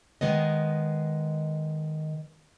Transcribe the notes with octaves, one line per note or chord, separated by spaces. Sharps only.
D#3 G#3 B3 D#5